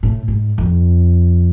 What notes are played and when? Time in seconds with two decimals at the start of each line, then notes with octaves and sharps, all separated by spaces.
0.03 A2
0.28 G#2
0.58 F2